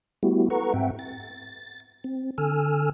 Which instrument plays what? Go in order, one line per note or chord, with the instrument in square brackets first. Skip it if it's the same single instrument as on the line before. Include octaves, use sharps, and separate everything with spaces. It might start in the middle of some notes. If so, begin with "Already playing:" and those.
[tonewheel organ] G3 A3 B3 E4 F#4 G4
A4 B4 F#5 A#5 C#6
G#2 C4 E5 F#5 G5
A6
C4
D3 A4 G#5 E6 F6